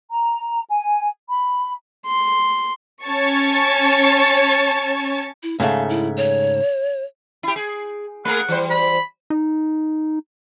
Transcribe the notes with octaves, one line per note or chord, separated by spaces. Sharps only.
A#5
G#5
B5
C6
C#4 C#5 A5 C#6
E4
G#2 C#3 A3 F5
E4
C#5
E4 G4
G#4
A3 G#4 A#4 F#5
E3 G3 C5
B5
D#4